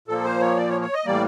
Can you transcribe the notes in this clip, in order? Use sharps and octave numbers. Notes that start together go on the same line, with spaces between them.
A#2 F3 A#3 A4
C5
C#5
D5
C#5
C#5
D#5
A2 E3 G3 A#3 D5